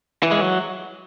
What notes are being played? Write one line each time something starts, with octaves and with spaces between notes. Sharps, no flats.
E3
G#3
F#3